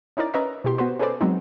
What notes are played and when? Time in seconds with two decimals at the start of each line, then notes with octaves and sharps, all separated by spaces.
0.17 C#4 D#4 E4 A#4 D5
0.34 C#4 A#4 B4 D#5 E5 A#5
0.64 B2 E4 G4 C6
0.78 B3 F#4 B4 C5
0.99 C#4 G#4 A4 B4 C5 D5
1.21 F#3 G#3 B3 C4 D#4